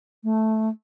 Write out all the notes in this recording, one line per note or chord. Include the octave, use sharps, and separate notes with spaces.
A3